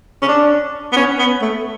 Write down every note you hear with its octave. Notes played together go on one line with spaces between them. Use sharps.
C#4
D4
B3
C#4
B3
A3